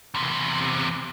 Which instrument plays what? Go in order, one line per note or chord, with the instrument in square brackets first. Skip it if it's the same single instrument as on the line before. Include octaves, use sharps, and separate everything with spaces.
[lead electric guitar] E2 C3